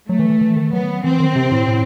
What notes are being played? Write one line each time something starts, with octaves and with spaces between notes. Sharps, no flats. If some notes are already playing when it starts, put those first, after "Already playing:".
F#3 A3
E3
E3
E3
D#3
F#3 B3
E3 C4
D#3
C3
A2
A2